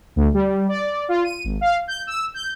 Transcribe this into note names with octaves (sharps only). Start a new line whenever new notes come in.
D2
G3
D5
F4
D#7
G#1
F5
G6
E6
G6